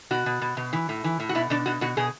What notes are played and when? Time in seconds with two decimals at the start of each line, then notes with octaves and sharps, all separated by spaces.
0.11 B2 F#4
0.26 B2
0.42 B2
0.57 B2
0.73 E3
0.89 A2
1.04 E3
1.20 A2
1.29 F#4
1.35 B2 E4
1.50 B2 D4
1.66 B2 F#4
1.81 B2 F#4
1.97 B2 G#4